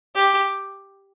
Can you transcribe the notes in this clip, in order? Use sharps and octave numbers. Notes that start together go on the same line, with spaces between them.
G4